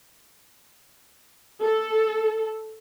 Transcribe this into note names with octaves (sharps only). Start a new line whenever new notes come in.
A4